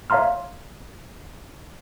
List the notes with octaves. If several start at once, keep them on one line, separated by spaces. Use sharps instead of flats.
C#5 E5 F5 A#5 C6 F6